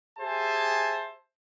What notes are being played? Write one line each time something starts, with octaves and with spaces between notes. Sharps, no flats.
G4 G#4 C5 E5 G#5 A5